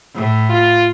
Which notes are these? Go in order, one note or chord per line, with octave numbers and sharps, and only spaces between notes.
A2
F4